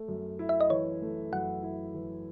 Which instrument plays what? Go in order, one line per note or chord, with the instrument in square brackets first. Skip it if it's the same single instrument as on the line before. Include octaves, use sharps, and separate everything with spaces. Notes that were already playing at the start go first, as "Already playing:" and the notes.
Already playing: [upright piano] A3
F#2
E4
[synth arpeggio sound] E5
D#5
[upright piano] E3 [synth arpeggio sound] C#5
[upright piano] A3
[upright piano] F#2 [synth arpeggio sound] F#5
[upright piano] E4
E3